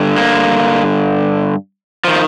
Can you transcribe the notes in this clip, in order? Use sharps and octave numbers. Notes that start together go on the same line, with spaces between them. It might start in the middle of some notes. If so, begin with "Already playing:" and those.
Already playing: G2 D3
A#3
D#3 F3